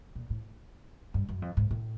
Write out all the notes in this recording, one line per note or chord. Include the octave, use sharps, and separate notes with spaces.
A#2
A2
G2
F#2
F2
G#2
A2